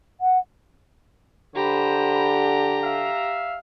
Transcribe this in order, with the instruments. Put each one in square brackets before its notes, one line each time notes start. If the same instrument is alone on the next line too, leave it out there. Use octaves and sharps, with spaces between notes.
[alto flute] F#5
[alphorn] D3 [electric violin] G4 A#5 [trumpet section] C5 B5
[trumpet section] E5 F5